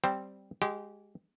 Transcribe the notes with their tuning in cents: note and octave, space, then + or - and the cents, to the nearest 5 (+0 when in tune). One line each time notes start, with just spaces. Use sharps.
G3 -5 C4 +0 C5 +0
G#3 -5 G4 -30